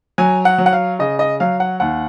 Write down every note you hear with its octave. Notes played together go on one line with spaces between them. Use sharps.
F#3 G#5
F#5
F#3
F#5
F5
C#3 D#5
D#5
F#3 F5
F#5
D#2 F#5